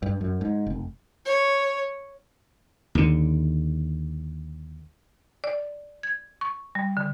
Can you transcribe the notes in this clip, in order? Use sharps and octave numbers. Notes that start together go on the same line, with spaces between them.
G2
F#2
G#2
F1
C#5
D#2 D3
D5
G#6
C#6
G3
D3